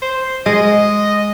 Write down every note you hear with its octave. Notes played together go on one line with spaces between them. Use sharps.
C5
G#3 D#5